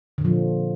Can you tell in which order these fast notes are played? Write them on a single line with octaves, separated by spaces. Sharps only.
D3 A#2 F3